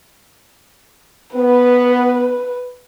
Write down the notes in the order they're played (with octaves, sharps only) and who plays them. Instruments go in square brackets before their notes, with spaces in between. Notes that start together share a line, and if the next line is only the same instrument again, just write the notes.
[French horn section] B3 [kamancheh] B4